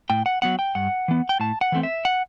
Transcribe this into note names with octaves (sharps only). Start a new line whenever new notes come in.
A2 G5
F#5
F#3 B3 F#5
G5
G2 F#5
E3 B3
G5
A2 A5
F#5
E3 A3 C4
E5
F#5